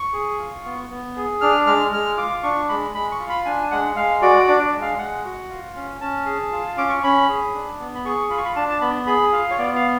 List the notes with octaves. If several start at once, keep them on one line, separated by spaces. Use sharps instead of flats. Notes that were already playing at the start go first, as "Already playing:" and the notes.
Already playing: C#6
G#4
F4
B3
B3
G#4
D4 F6
G#3 F6
G#3 F6
F4 D6
D4 C#6
G#3 B5
G#3 B5
C#6
F4
B5
D4 G#5
G#3 F#5
G#3 F5
F#4 D5
D4 D5
D5
G#3
F5
G#3 F#5
F#4
F4
C#4
C#4 A5
G#4
F4
C#4 D6
C#6
C#4 B5
G#4
D4
B3
B5
G#4 C#6
F4 B5
C#6
B5
D4 A5
A5
B3 B5
G#4 B5
F4 F5
C#5
B3 D5
F5